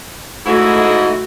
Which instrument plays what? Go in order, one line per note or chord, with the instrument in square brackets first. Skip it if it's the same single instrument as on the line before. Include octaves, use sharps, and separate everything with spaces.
[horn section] G#2 E4 D#5 [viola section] A3 F#4